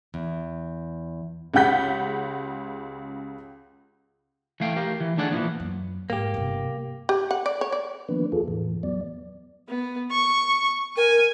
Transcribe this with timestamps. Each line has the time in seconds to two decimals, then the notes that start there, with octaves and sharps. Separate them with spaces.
0.14 E2
1.54 C#2 C#3 G4 F#5 G6 B6
4.60 E3 A3 F5 G5
4.76 G4 A#4 F5
5.00 E3
5.17 D#3 A3 D4 G#4 D5 F#5
5.31 A#2 E3 F3 B3
5.60 F#2
6.10 G#2 A#3 G4
6.34 G1 C3
7.09 G4
7.31 F#5
7.46 D5
7.61 C#5
7.72 D5
8.09 D#3 F3 A#3 B3 D4 B4
8.32 E2 F4 G#4 A4
8.48 E2 A2 E3
8.83 E2 F#3 B3 D5
9.68 B3
10.11 C#6
10.97 A#4 G#5